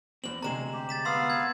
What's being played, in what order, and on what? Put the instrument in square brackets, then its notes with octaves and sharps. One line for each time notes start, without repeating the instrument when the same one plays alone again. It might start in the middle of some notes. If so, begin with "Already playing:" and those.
[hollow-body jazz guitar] E2 C4 [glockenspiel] F#7
[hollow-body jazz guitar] D2 C3 G#3 [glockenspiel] A#5 E7
[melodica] G4
[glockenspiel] A6 B6 E7
[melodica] B3 F5 [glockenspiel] C6 E6
[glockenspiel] G#6